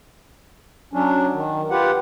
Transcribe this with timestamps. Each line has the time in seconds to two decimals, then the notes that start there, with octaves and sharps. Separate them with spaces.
0.93 F#3 C#4 D4
1.33 D#3
1.71 F4 G4 B4 F#5